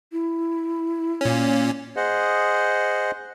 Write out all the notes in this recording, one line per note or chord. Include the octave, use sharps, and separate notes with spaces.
E4
A#2 C#4
G#4 C5 D#5 F#5